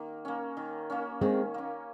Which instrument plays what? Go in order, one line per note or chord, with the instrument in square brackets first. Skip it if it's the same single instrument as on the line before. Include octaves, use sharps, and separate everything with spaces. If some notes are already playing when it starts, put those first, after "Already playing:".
Already playing: [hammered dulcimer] D#3 A#3
A#3 C#4
D#3
A#3 C#4
[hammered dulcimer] D#3 [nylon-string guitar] G#3 C4
[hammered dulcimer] A#3 C#4